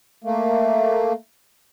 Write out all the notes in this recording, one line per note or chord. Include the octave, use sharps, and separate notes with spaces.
A3 A#3